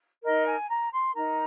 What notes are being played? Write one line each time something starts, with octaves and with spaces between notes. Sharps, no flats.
D#4 A#4 D#5
G#5
A#5
C6
D#4 A#4 A#5